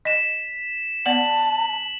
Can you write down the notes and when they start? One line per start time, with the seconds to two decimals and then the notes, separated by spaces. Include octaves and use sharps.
0.05 D#5 B6 E7
1.06 B3 D5 F#5 A5 F#7